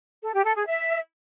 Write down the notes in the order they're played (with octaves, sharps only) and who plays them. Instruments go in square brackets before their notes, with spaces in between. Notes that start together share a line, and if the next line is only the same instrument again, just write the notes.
[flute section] A4
G4
A4
G#4
E5